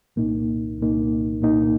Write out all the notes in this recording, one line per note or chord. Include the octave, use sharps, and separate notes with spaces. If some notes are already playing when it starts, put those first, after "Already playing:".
C2 A#2 A#3 D#4
C2 A#2 A#3 D#4
C2 A#2 A#3 D#4